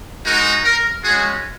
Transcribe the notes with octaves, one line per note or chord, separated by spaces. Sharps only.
G#3 D#4 F#4 A#4
A#4
G#3 C#4 F#4 G#4